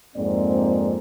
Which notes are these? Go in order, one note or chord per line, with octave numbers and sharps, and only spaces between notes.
F2 G#2 A#3 C4 D5